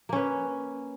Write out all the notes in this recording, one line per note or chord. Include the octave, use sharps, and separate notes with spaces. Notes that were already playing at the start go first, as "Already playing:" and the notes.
A#3 C#4 B4